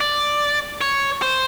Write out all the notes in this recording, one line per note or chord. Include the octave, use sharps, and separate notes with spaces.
D5
C#5
C5